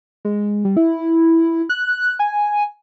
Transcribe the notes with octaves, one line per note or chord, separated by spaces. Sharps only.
G#3
G3
E4
F#6
G#5